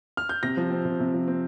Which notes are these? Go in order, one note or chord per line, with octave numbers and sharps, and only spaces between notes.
F6
G6
C3 A#6
F3
C4
C3
C3
F3
C4